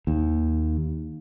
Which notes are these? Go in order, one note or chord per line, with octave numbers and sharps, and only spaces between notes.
D#2